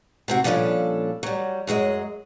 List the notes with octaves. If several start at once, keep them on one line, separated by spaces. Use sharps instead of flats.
C3 C4 F#4
A#2 F3 G3 C#4 D4 A4
F#3 G3
F#2 F#3 G#3 D#5